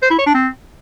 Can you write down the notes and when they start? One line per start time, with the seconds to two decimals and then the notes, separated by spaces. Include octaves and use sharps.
0.02 C5
0.10 E4
0.18 C#5
0.26 D4
0.34 C4